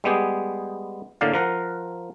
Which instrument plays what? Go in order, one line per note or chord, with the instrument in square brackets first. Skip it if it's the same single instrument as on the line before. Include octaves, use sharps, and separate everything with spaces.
[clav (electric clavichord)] G3 G#3 B3 G4 G#4
A2 D3 A#3 D5 F5
F3 A#4 F#5